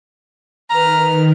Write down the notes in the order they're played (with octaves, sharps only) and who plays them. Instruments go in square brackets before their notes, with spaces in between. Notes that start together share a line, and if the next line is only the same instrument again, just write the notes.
[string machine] D#3 [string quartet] B4 F6 [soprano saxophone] A#5